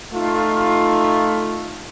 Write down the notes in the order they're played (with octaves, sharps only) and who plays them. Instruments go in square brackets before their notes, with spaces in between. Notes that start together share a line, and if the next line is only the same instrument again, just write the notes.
[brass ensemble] A3 D#4 F4